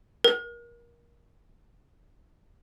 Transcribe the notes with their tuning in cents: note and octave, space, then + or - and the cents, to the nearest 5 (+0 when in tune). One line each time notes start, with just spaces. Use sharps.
A#4 +25